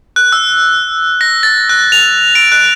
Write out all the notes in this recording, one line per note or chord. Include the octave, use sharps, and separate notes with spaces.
F#6
E6
A#6
A6
F#6
F7
D7
F#6